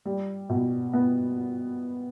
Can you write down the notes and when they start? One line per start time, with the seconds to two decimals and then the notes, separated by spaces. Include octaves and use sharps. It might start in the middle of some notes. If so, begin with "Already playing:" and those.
0.05 G3
0.49 B2
0.93 B3